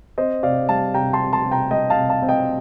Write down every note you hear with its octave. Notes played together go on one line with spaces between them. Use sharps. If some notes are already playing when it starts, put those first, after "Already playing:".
C4 C5 D#5
C3 D5 F5
G3 F5 A5
C3 G5 A#5
A5 C6
C4
A5 C6
C3
G5 A#5
G3 D#5 G5
F5 A5
C3
F5 A5
C4
D#5 G5